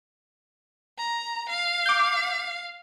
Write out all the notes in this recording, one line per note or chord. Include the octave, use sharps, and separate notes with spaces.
A#5
F5
D6 G6